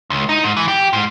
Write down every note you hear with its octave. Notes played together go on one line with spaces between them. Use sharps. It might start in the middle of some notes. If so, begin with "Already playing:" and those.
C#2
D#4
G#2
E3
G4
G#2